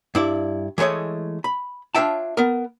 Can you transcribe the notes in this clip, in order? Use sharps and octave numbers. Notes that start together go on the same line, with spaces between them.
G2 E4 D5
E3 G#3 A3 C#5 D#5
B5
D4 F4 C#5 E5 G5 A5
B3 A#4